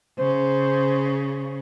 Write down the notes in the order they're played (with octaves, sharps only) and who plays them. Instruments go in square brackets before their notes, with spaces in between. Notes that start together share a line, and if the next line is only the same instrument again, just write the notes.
[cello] C#3 [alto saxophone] C5